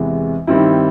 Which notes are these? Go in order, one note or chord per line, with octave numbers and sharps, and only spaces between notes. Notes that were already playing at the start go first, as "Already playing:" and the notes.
Already playing: E2 C3 E3 G#3
G2 D#3 G3 C4 E4